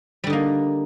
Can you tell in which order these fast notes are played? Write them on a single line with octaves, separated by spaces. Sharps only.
G3 D3 D#4 A#3